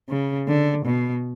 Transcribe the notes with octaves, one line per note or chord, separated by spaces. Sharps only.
C#3
D3
B2